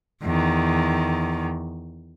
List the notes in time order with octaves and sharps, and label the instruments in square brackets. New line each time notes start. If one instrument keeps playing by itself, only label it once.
[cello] E2 D#3